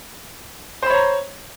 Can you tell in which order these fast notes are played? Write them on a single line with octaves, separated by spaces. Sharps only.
C5 B5 C#5 A#5